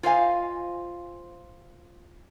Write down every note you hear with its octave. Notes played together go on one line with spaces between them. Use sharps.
F4 C5 D#5 F5 G#5